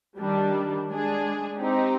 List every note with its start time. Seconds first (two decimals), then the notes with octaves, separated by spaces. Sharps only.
0.19 D#3 G3 D4
0.89 G#3 D4 G#4
1.58 C4 D#4 G4